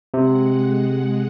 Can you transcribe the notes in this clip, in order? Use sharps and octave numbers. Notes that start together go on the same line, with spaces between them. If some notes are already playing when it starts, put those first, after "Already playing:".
C3 G#3 F#5